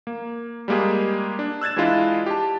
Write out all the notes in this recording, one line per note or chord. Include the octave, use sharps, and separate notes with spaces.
A#3
G3 G#3 A#3 G4 G#4
D4
E6 F#6 G#6 A6 E7
E3 G#3 D4 E4 F4 D#5
G4 A5